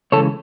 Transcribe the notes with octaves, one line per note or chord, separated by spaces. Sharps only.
C#3 E3 G#3 A4 C#5